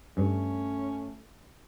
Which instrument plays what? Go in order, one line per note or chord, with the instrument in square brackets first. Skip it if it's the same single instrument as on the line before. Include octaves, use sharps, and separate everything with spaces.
[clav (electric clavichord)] G2 [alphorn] A3 [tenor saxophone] C#4